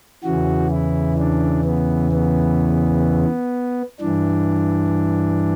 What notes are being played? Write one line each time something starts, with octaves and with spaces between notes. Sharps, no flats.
E2 C#3 E3 F#4
E4
D4
B3
B3
G2 E3 D4